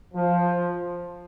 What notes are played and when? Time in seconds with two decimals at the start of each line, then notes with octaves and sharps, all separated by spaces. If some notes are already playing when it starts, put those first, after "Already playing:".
0.14 F3